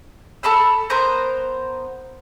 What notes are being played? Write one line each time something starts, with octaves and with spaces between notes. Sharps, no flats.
A4 A5 B5 E6
B3 A#4 C5 A#5